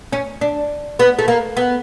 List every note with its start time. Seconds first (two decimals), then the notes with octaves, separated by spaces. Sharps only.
0.13 C#4
0.41 D4
0.99 B3
1.19 A3
1.28 A#3
1.57 B3